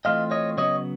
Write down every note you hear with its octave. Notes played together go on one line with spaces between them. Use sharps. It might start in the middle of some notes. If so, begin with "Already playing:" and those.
E3 A3 C4 F4 D#5 F5
C#5 D#5
C#3 F#3 B3 C#5 D#5